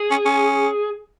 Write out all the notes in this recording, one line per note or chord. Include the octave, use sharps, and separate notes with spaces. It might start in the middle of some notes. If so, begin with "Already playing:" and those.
Already playing: G#4
C#4
C#4